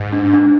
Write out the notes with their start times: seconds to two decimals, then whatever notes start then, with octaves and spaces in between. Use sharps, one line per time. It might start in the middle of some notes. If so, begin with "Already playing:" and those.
Already playing: G#2
0.12 D4
0.33 D4